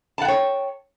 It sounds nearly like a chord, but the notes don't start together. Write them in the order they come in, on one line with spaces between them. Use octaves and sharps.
A5 F#5 G5 C#5